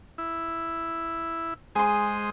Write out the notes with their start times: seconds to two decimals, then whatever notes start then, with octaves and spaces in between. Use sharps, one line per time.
0.18 E4
1.75 G#3 G#4 C5 C6 D#6